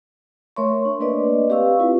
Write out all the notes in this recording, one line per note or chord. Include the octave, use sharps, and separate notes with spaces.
A3 A#4 C#5 E5 C6 C#6
D4
A#3 D4 B4 D5 D#5
C4 G4 B4 F5 C#6 E6
E4 F4 B4